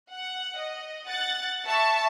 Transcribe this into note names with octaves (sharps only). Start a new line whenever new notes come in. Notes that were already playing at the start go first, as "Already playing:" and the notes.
F#5
D#5
F#5 F#6 A6
E5 A5 C#6